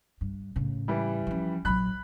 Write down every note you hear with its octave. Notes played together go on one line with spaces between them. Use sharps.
G2
A2 C#3
E3 G3
F3 C#4
A#1 F#3 B5 F#6